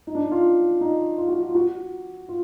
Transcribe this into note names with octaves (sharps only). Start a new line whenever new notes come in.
D#4
D4
D#4
F4
D#4
F4
F#4
F4
F#4
F4